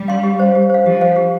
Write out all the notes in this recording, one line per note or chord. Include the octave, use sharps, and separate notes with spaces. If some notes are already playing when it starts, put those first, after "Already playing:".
Already playing: G3
F5 C6
G4
C5 F5
G4
C5 F5
F3 G4
C5 F5
G4